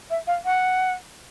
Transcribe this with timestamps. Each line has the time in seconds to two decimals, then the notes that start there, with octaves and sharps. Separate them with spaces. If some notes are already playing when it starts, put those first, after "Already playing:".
0.10 E5
0.27 F5
0.45 F#5